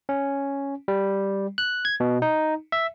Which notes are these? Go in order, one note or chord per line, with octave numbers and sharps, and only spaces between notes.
C#4
G3
F#6
G#6
B2
D#4
E5